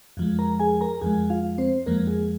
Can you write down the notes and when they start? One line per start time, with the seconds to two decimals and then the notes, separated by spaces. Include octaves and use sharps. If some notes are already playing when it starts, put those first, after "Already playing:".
0.17 F2 F3 G#3
0.39 A#4 A#5
0.60 G#4 G#5
0.81 A#4 A#5
1.01 F2 F3 G#3 G#4 G#5
1.30 F4 F5
1.58 C4 C5
1.86 F2 F3 G#3 A#3 A#4
2.07 G#4